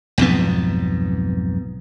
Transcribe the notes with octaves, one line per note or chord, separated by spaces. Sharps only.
B1 F2 G#2 B3